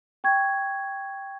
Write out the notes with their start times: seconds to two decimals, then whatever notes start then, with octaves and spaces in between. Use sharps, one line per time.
0.24 G5 C#6 G#6